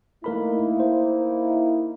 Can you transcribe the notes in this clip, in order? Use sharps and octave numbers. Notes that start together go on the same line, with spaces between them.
A3 A#3 D#4 E4 A#4 B5
C5